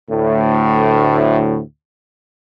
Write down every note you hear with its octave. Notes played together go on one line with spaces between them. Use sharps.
D2 A2